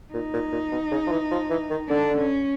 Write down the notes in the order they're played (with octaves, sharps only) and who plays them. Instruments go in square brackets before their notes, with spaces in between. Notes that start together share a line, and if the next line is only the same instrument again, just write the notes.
[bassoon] A#2 [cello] D#4
[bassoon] A#2
A#2
B2
C#3
F3
E3
F3
E3
D#3
[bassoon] D3 [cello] D4
[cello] C#4